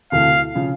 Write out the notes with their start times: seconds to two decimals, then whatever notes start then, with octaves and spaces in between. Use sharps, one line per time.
0.12 D2 C3 E3 A3 F5
0.55 C#3 F3